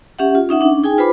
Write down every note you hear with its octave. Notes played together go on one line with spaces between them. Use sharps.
C#4 G4 E5 F#5
F4
C#4 D#4 E5 F#5
C#4 D4
D#4 G#4 G5 G#5
F4 B4 C5 B5 D6